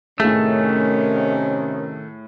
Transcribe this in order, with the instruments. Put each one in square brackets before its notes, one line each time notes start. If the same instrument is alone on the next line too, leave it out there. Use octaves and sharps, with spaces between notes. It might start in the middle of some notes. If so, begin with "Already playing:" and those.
[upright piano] A2 G#4 [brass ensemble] C3 C#4 [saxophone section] D#3 [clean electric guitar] A3